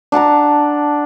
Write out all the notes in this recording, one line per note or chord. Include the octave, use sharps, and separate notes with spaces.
D4 F#5 A5 A#5